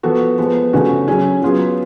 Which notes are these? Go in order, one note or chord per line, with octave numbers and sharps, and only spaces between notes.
F3 B3 F#4 A4
F3 G#3 B3
C#3 F3 A3 C#4 F#4
F#3 C#4 G#4
F#3 B3 F4 G#4